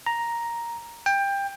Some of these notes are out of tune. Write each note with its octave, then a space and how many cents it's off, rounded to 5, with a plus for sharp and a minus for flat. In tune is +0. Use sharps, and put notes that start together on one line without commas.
A#5 +5
G5 +20